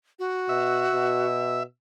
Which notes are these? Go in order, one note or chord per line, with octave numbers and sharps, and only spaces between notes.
F#4
B2 E5
B2